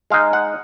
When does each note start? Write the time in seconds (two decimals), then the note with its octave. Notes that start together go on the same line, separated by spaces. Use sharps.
0.10 G#3 D#4 F5
0.33 F#5